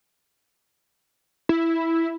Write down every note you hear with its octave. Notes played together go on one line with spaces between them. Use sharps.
E4